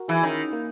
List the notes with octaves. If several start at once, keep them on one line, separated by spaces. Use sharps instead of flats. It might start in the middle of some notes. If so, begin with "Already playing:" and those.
Already playing: F#4 A#4
E3 E4 G#4
D#3 C#4 E4
A#3